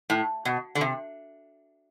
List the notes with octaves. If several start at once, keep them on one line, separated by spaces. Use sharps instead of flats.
A2
B2
D3
C3